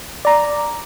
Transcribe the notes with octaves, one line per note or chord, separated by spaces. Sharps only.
D5 A#5